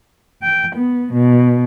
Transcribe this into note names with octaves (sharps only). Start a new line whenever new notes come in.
G5
B3
B2